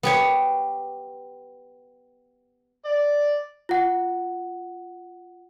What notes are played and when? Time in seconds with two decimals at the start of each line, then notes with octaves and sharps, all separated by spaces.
0.03 B3 G4 C#5
2.85 D5
3.69 F4 F#5